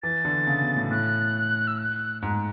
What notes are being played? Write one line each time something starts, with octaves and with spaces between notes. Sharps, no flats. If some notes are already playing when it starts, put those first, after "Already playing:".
E3 A6
D3
C#3
B2
A2
A2 F#6
E6
F#6
G#2